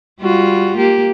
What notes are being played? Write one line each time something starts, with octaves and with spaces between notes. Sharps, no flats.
G3 F4 F#4
A#3 G4